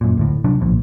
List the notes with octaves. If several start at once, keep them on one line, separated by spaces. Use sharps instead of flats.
F#2 A#2
D1 D2 A2
C#2 C3 F#3 D4
D1 B1 A#2 F3